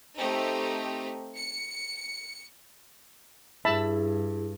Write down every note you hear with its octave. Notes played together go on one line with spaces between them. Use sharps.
A3 C4 D#4 G4
C#7
G2 E4 G#4 E5 A5 B5